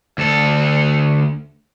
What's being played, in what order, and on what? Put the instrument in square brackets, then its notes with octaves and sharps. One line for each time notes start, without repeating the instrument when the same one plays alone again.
[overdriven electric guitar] D2 A4